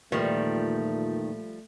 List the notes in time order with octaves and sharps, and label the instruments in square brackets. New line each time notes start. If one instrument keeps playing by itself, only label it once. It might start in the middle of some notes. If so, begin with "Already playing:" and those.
[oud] E2 D#3 [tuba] A#2 [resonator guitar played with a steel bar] F3 G3 [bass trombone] A3